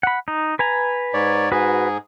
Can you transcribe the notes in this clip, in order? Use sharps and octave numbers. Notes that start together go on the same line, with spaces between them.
F#5 B5
D#4
B4 G#5 A#5
G#2 C#5 D5
G#2 F#4 G#4 B4